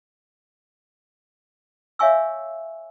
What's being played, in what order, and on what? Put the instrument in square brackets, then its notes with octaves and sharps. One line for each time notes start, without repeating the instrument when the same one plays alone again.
[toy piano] C#5 E5 F5 G#5 C#6 E6